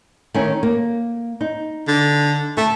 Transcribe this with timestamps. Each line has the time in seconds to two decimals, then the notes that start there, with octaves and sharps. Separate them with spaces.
0.34 D#3 A3 C#4
0.63 A#3
1.41 D#4
1.88 D3
2.57 A3 A5